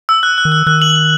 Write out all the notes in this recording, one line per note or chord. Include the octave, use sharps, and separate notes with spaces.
E6
F#6
F#6
D#3
F#6
D#3 F#6
F#7
F#7